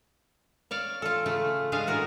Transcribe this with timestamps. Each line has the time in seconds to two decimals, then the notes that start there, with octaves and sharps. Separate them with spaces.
0.71 C#5 D5 F5
1.02 F4 A4
1.26 C#3 A3 F4
1.72 G#3 C#4 D4 G#4 F5
1.87 A2 F#4 A#4